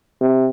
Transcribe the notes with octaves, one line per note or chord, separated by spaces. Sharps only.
C3